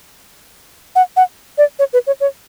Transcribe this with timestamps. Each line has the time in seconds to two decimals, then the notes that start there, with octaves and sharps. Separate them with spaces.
0.96 F#5
1.16 F#5
1.58 D5
1.79 C#5
1.93 B4
2.07 C#5
2.20 C#5